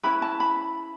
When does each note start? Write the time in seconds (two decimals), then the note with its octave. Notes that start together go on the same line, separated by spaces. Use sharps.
0.03 C#4 E4 B4 B5
0.22 A5
0.40 B5